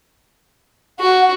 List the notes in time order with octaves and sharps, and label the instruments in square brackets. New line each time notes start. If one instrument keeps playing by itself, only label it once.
[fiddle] F#4 [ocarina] F#5